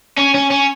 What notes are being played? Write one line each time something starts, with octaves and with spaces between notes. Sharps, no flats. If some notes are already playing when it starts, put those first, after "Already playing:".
C#4
C#4
C#4